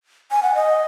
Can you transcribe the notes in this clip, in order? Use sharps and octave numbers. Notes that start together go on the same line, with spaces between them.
G#5
F#5
D#5